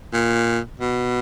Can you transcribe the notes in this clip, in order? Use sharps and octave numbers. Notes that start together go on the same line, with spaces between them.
A#2
B2